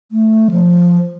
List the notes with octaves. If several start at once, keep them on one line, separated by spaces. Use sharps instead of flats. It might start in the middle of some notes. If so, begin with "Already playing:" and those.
A3
F3